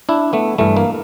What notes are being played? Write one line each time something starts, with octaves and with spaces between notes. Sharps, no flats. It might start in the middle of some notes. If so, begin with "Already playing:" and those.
D4 E4
A3 B3
G2 E3 G3 A3
A#3